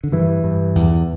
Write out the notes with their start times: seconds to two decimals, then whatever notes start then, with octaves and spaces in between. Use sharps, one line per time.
0.04 D3
0.12 G2 E3
0.44 G2
0.75 E2